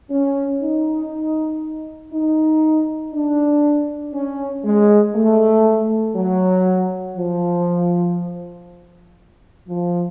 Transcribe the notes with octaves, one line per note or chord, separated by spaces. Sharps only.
C#4
D#4
D#4
D4
C#4
G#3
A3
F#3
F3
F3